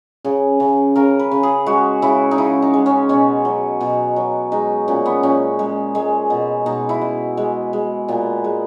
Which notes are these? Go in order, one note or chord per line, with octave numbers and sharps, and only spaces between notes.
C#3 G#4
C#3
C#3 A#4
B4
C#3
G#4
G#3 F#4
C#3 E4
D#4
C#3 E4
D#4
G#3
C#4
B2 C#4
F#3
B2
F#3
G#3 D#4
A#2 C#4
B3
A#2 C#4
G#3
G#3
B2
B2 D#4
E4
B2
G#3
G#3
A#2 B3
G#3